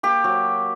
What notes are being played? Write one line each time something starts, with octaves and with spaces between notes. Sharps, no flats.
A#3 G4
F#3